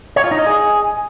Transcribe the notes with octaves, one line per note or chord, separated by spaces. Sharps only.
C#5
F4
D#4
D#5
G#4